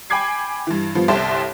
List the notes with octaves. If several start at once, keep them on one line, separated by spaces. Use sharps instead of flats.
G5 G#5 B5 D6 G#6 C7
G2 E3
G2 F3 B3
G1 C2 G4 E5 A5 C6